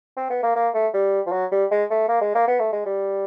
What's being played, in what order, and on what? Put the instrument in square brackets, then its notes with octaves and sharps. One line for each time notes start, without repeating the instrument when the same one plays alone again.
[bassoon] C4
B3
A#3
A#3
A3
G3
F3
F#3
G3
G#3
A3
A#3
G#3
A#3
B3
A3
G#3
G3